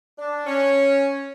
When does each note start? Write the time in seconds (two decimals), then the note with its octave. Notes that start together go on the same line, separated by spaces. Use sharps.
0.18 D4
0.47 C#4